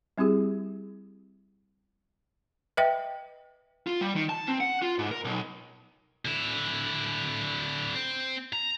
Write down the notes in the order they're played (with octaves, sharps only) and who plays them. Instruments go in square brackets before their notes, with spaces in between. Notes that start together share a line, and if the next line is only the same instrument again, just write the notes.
[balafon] G3 C4 E4 G4 G#4
B4 D#5 E5 G5
[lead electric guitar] F4
G3
D#3
A5
C4
F#5
F4
G#2
A#4
B1
[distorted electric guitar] D3 E4
C4
A#5